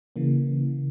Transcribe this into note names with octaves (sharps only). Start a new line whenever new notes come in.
C#3 E3 A#3